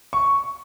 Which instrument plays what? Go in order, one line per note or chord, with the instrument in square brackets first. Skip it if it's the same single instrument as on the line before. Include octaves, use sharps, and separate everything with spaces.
[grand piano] C#6